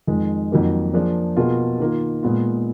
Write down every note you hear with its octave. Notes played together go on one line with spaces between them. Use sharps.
F2 D#3 G#3
F2 D#3 F#3 A#3 D#4
F3 A#3 D4 G#4
B2 A#3 F4 G#4
D#3 A#3 F4
A#2 G#3 B3 F4